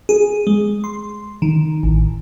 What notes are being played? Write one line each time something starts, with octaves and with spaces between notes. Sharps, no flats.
G#4
G#3
C6
D#3
A1